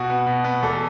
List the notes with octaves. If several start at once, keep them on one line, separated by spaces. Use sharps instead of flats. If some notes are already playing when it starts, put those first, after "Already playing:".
Already playing: B2 F#4
B3
B2
B3
E2 A4